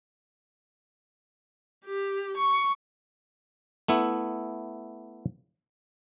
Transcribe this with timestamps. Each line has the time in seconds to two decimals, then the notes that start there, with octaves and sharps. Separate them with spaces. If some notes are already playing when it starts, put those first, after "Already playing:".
1.86 G4
2.37 C#6
3.88 A3 B3 E4